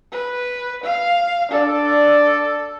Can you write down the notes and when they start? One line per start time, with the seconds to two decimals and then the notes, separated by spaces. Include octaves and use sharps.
0.12 B4
0.84 F5
1.52 D4 A4 D5